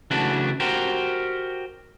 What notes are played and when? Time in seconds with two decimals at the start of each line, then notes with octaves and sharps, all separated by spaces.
0.11 C#3 E3 F#3 A3 D4 F#4
0.60 F#4 G4 A#4 C5